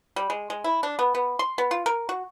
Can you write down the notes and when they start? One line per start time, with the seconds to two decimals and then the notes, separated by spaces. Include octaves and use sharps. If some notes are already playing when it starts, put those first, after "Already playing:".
0.16 G3
0.30 G#3
0.50 G#3
0.64 E4
0.83 D4
0.99 B3
1.15 B3
1.39 C6
1.58 B3
1.71 F4
1.86 A#4
2.09 F#4